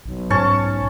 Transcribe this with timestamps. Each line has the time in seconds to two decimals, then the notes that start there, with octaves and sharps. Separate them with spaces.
0.06 B1
0.30 G#2 C#4 A5 C#6